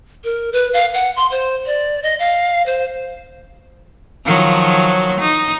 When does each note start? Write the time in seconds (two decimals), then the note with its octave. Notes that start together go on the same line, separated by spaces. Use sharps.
0.24 A#4
0.53 B4
0.74 F5
0.94 F#5
1.16 C6
1.31 C5
1.66 D5
2.03 D#5
2.19 F5
2.66 C5
4.25 D#3 F3 F#3
5.20 D#4